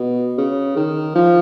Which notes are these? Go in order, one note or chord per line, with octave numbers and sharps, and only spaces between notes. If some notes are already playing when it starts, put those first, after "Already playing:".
Already playing: B2
C#3
D#3
F3